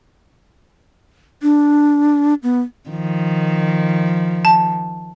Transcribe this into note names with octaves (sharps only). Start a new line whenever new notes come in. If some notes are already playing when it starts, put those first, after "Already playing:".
D4
B3
D#3 F3
A5